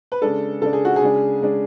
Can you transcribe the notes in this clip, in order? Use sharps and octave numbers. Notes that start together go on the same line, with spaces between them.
B4
C#3 G#3 D4 A4
C#3 G#3 D4 A4
G#4
F#4
G#4
C#3 G#3 D4
C#3 G#3 D4